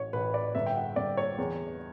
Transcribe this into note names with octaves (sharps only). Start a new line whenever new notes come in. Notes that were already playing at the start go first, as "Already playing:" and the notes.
Already playing: A1 C#5
A1 B4
D5
G1 E5
G5
F#5
G1 D5
C#5
E2